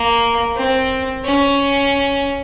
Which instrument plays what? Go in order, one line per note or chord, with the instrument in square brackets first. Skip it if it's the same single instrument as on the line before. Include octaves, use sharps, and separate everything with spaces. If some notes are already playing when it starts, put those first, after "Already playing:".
Already playing: [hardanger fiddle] A#3
C4
C#4